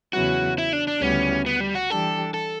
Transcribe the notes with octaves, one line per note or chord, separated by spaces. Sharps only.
E2 C#3 F#3 B3 E4 F#4
E4
D4
D4
D2 C#3 G3 B3 C#4 E4
B3
G3
F#4
E3 G3 D4 G4 A4
A4